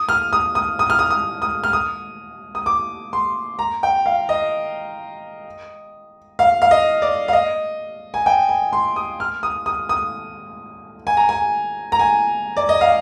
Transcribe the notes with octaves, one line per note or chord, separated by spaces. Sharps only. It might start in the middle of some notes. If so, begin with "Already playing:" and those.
Already playing: D#6
F6
D#6
D#6
D#6
F6
D#6
D#6
D#6
F6
D#6
D#6
D6
C6
A#5
G5
F5
D#5
F5
F5
D#5
D5
F5
D#5
G#5
G5
G#5
C6
D#6
F6
D#6
D#6
D#6
G#5
A#5
G#5
A#5
G#5
D5
D#5
F5